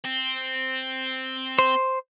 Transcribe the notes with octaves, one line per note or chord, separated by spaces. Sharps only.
C4
C5